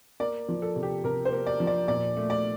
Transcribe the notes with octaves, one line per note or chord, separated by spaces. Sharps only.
A#3 D5
F3
A4
C3
G4
C3 A#4
C5
A#3
D5
F3
D5
A#2 D5
A3
D5